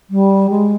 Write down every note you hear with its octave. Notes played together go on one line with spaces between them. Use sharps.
G3
G#3